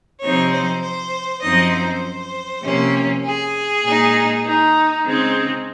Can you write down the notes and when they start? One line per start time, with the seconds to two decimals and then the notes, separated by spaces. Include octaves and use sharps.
0.22 C3 F3 C4 D#4 C#5
0.52 C5
0.83 C5
1.43 F#2 F3 C4 D#4 D#5
1.73 C5
2.63 C3 F3 A#3 C#4
3.24 G#4
3.84 A#2 G#3 D#4
4.45 D#4
5.06 C#3 G#3 C4 D#4